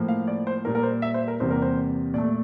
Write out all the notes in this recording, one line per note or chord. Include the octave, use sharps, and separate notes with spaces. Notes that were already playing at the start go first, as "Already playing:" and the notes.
Already playing: A2 F3 A#3
F5
D5
C5
A#2 G3 A#3 A#4
A#4
C5
E5
C5
A#4
E2 C3 G3 A#3 C5
A#4
C5
A#2 A3 D5